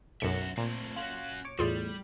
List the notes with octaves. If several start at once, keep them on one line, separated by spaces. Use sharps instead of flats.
B1 F#2 F#4 E5 C#7
A#2 A3 C4
C#4 F4 F#4 F#6
C#5 D6
E2 A2 G3 F4 G#4 D5